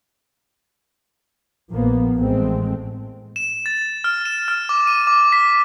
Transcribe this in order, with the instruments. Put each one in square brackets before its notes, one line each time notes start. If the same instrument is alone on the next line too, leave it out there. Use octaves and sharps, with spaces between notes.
[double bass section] A#1 F3 A#3 B3
A1 A2 G#3 A3 C4
[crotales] E7
A6
F6
E7
F6
D6
D#7
D6
B6